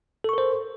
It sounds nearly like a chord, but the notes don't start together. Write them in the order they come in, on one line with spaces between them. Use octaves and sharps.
A4 C#6 A#4 C5